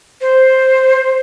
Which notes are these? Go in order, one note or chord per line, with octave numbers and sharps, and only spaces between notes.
C5